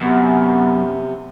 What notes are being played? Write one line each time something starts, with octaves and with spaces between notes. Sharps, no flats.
F#2 C3 B3